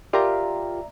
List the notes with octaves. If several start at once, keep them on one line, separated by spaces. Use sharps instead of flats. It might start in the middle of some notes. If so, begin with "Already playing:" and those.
F4 G4 A#4 D5 E5 A#5